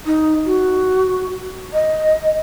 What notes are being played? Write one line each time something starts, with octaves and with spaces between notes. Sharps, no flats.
D#4
F#4
D#5